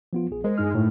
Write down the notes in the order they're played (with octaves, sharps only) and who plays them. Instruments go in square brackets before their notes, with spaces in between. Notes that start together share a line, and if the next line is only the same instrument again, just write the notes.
[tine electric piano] F3 B3 F4
A#1 G#4
[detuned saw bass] G#3 [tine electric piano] A#4 C5
[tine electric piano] G2 D#4 F6
[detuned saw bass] A2